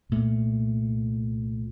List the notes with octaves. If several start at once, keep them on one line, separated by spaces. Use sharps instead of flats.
C2 A#2 A3